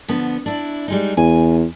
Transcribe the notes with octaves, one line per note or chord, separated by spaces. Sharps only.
D3 F3 B3
D4 E4
G3 G#3 D#4
E2 G#5